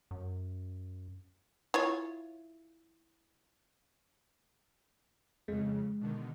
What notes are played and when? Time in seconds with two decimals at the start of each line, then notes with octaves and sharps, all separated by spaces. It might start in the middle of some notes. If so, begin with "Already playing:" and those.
0.11 F#2
1.74 E4 F4 C#5
5.48 F2 C#3 G#3
6.01 B2 D3 D#3